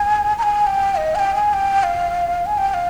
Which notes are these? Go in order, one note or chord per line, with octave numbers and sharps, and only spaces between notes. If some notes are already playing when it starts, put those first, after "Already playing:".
Already playing: G#5
A#5
G#5
G5
D#5
G#5
G5
G#5
G5
F5
G#5
G5
G5
F5